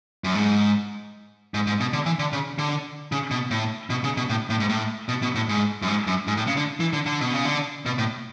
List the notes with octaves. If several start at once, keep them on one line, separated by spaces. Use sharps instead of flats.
F#2
G#2
G#2
G#2
B2
D3
E3
D3
C#3
D3
C#3
B2
A2
B2
C#3
B2
A2
A2
G#2
A2
B2
B2
A2
G#2
F#2
G#2
F#2
G#2
A2
C#3
D3
E3
D3
D3
B2
C#3
D3
B2
A2